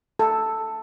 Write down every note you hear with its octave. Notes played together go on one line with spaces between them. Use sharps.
A4